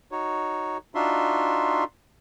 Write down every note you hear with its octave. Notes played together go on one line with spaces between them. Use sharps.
D#4 F#4 C#5
D4 D#4 F4 F#4 E5 C6